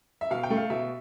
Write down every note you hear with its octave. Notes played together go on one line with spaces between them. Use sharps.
E5
B2 F5
G5
A3
F5
B2 E5